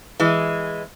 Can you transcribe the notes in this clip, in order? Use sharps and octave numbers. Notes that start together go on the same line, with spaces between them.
E3 G#3